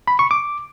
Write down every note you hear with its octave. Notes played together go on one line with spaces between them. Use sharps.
B5
C#6
D6